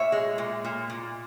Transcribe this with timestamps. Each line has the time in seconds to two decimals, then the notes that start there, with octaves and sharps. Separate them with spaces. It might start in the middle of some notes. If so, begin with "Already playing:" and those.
Already playing: A#2 C#5 E5
0.12 G#3
0.38 A#2
0.64 A#2
0.90 A#2